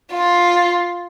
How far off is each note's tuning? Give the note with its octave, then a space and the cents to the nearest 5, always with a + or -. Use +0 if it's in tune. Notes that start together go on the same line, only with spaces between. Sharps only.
F4 +10